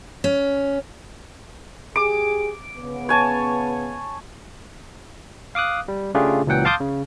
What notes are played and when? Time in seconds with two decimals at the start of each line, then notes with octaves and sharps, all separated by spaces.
0.24 C#4
1.96 G4 G#4 D6
2.77 C#3 B3
3.09 C#5 G#5 A5
5.55 F5 D6 D#6 F#6
5.88 G3
6.14 C#3 A3 D4 F4 G4 G#4
6.47 C#2 A#2 E3 F#3 F#5 G5
6.65 F5 A5 C6 D6 D#6 G6
6.80 C#3